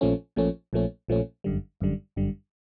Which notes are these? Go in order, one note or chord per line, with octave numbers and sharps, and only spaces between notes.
A#1 A#2 F3 A3 C#4
A#1 A#2 F3 A3 C#4
A#1 A#2 F3 A3 C#4
A#1 A#2 F3 A3 C#4
G1 F#2 D3 G3
G1 F#2 D3 G3
G1 F#2 D3 G3